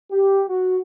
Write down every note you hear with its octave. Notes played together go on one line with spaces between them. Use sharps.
G4
F#4